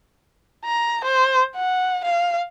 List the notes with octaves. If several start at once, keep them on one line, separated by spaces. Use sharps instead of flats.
A#5
C5
F#5
F5